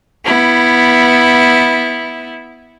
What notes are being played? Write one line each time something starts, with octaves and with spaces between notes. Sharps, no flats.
B3 E4